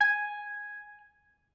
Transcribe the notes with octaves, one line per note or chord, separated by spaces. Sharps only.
G#5